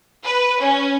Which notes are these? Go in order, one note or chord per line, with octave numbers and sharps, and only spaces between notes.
B4
C#4